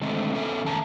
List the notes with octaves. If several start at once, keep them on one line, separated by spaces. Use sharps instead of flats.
D3 D#3 G#3 A3 C4 D#4
B3 C#4 A4 E5
F2 D#3 A3 A5 A#5